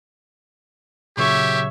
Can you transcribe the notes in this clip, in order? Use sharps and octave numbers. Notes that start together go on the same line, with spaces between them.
A#2 C#3 F#3 G4 C#5 E5